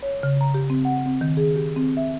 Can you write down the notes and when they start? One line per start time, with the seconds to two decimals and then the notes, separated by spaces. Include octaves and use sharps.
0.03 C#5
0.23 C#3
0.41 A#5
0.54 G4
0.70 C4
0.85 F#5
1.06 C4
1.21 D#3
1.37 G#4
1.56 G4
1.76 C4
1.97 E5